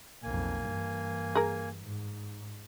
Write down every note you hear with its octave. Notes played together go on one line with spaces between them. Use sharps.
B1 F2 A#3 G#5
G2 E3
G#4 A#4
G#2